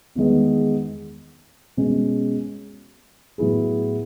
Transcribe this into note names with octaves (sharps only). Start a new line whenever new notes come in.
E2 D#3 G#3 B3
B2 G#3 C#4
A2 F#3 B3 E4 G#4